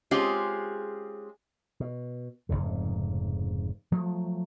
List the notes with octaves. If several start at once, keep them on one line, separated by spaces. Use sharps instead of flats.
G#3 C4 C#4 F4 G4 G#4
B2
F1 A#1 G#2 C#3
F3 F#3 A3